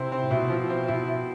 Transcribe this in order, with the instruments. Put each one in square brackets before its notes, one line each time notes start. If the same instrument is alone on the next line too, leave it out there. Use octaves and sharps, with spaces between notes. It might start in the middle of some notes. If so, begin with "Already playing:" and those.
Already playing: [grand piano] C3 [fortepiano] C4 E4
[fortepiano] C4
[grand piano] A2
[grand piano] B2 [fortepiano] E4
[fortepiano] F3
C4
[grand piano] B2 [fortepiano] E4
[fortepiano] E4